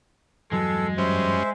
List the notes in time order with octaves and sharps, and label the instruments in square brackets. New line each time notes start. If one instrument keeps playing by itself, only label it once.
[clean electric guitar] E2 G2 F#3 [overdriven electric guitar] G#3 [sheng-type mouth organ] A4
[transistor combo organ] F#2 G3 C#4 [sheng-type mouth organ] C5 E5